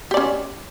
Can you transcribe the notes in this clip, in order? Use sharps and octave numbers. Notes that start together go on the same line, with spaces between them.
C#4 G4 D5